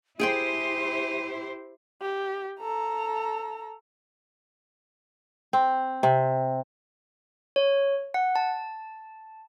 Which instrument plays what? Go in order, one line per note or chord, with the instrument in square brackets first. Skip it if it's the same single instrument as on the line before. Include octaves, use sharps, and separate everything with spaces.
[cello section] E4 G4 C5 [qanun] G#4 G5 C6 [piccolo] D#7
[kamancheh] G4
A4 A#5
[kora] C4
C3
[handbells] C#5
F#5
A5